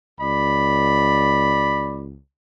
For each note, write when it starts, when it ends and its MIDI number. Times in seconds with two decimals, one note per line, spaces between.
0.21 2.18 37
0.21 2.04 74
0.21 2.04 83